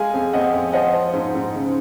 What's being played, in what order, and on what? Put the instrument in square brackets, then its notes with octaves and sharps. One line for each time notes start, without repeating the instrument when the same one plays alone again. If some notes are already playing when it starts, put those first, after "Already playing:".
Already playing: [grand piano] G#3 F5 G#5
F2
F2 D#5 F#5
F2
F3 D#5 F#5
F3
G#2
G#2
C#3